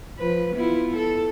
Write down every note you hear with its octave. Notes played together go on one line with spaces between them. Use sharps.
F3 B4
B3 E4 F4
A4